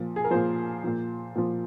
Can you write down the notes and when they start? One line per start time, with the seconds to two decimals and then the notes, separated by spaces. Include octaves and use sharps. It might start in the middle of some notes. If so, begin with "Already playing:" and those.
Already playing: A#2 F3
0.16 G#4
0.24 A#4
0.31 A#2 F3 C5
0.84 A#2 F3
1.35 A#2 F3